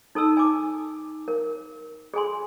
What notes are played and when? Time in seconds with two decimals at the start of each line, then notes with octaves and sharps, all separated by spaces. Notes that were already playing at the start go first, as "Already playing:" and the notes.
0.15 D#4 A4 A5 E6
0.37 G#5 D6
1.28 A#4
2.14 G#4 A4 G#5 C6